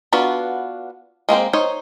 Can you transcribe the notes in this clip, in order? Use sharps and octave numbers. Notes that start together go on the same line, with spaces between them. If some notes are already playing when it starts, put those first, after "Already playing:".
B3 D4 F4 F#4 B4
G#3 A#3 C4 C5
D#4 C5 C#5